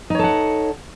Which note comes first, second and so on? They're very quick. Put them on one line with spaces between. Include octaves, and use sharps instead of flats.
D#4 C#5 A4 F#5